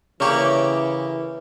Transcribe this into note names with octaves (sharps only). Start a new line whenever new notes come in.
C#3 E3 A#3 G4 C#5